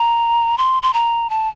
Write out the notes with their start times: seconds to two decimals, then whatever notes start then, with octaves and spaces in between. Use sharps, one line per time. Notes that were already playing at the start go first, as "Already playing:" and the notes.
Already playing: A#5
0.58 C6
0.82 C6
0.93 A#5
1.30 A5